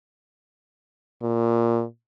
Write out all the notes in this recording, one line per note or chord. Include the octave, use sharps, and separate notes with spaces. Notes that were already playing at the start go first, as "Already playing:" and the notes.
A#2